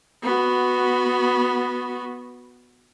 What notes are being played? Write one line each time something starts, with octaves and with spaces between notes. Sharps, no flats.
B3 F#4